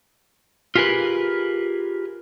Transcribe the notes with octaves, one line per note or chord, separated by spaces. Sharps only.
F4 G4 G#4 A#4 B4